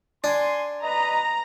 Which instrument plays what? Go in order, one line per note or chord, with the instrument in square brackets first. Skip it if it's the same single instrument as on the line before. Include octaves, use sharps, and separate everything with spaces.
[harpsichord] D4 [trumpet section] G#5 C6
[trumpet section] B4 D#5 [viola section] A#5